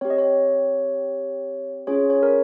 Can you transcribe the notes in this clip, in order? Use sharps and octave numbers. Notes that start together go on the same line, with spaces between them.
C4 G4 C#5
D#5
C#5
C#4 F4 G#4 C#5
C#5
A#4